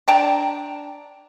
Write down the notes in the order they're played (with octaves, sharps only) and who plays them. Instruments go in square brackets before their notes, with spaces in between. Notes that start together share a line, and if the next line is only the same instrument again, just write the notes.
[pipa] D4 G5 A5 A#5